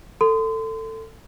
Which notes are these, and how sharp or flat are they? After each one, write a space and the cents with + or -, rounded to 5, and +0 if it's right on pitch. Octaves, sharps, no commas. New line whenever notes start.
A4 +15 C6 -30